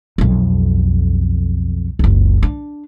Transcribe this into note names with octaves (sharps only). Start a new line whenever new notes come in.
B1 F2
F#1 C#2
D4